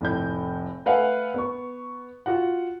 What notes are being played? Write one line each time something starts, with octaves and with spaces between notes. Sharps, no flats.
F1 A2 G6
A3 B4 F5 F#5 G#5
B3 C#6
F4 F#4 F#5